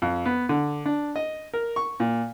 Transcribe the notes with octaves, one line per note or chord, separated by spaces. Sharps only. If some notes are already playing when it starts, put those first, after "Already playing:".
F2
B3
D3
D4
D#5
A#4
C#6
A#2